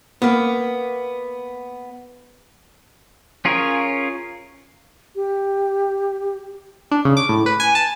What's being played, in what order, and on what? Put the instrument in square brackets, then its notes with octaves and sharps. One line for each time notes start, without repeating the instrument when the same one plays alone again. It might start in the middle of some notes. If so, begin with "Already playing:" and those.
[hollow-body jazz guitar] A#3 B3
[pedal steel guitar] C#4 F4 G#4 A#4 C#5
[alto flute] G4
[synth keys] D4
C#3
D6
A2
B4
G#5
A5